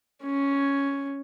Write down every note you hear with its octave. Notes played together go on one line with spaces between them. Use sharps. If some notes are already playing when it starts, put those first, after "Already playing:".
C#4